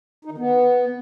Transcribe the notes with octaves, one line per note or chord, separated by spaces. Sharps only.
D#4
D#3
B3